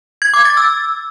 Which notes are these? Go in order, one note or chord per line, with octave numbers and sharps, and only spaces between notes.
G#6
D6
A6
E6